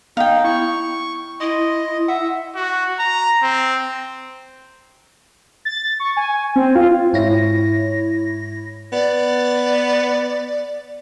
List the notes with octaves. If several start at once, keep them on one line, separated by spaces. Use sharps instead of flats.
B3 D#4 F5 G5
E4 C#6
E4 D#5 C6
E5 F#5
F#4
A#5
C4
A6
C#6
G#5
C4
F4
G#2 E4 C#5 A#6
B3 D5